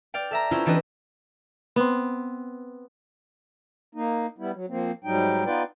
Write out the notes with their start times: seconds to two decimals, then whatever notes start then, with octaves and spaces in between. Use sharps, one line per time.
0.14 D5 F5 G5
0.31 A4 E5 A#5
0.51 C4 C#4 E4 F4 C5
0.66 E3 C4 D4 G4 B4 D#5
1.76 B3 C4
3.95 A#3 D#4
4.39 G3 B3 E4
4.53 F#3
4.69 F3 A#3 C4
5.04 G#2 F#3 G3 D#4 G5
5.46 B3 D#4 F4 B4 D5 G5